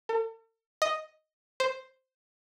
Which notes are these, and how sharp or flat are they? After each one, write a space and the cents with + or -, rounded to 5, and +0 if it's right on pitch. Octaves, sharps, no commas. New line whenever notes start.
A4 +45
D#5 +0
C5 +0